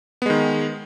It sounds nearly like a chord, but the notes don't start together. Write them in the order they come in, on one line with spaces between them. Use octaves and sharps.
B3 G#3 D#3